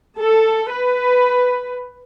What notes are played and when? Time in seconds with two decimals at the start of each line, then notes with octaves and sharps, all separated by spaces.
0.18 A4
0.71 B4